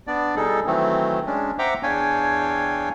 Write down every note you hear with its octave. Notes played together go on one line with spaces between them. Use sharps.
B3 D4 D5
B2 G3 D#4 G#4 A4
D#3 E3 F#3 A3 C4
G#3 C#4 D4
C5 E5 F#5 G5 A#5 D6
E2 D4 C#5 F5 G5 G#5